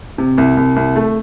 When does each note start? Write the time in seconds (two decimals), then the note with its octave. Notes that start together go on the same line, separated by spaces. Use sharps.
0.18 C3
0.38 C2
0.57 C2
0.76 C2
0.96 A3